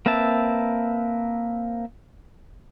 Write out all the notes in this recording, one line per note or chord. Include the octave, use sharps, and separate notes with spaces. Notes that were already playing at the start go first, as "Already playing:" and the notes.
A#3 C4 B4 E5 A5